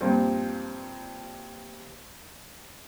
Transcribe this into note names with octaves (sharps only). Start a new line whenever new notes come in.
G2 A#2 F3 C4